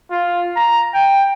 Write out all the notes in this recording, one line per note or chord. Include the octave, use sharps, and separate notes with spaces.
F4
A#5
G5